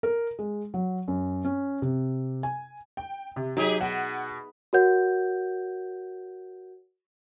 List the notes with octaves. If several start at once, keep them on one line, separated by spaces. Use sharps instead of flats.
A#4
G#3
F#3
F#2
C#4
C3
G#5
G5
C3
F#3 D#4 G4 G#4
B2 F#5
F#4 A#4 C#5 F#5 G6